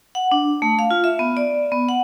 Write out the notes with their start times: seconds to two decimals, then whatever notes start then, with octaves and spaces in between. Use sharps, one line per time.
0.15 F#5
0.32 D4
0.62 A3
0.79 F5
0.91 F4
1.04 E5
1.19 B3
1.37 D5
1.72 B3
1.89 F#5